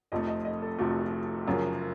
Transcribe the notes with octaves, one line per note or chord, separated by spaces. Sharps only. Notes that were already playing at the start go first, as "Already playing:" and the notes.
F1 F2 C3 F3 A3 D#5
D#5
D#5
A4
F1 F2 C3 F3 A3 F#4
F#1 F#2 C#3 F3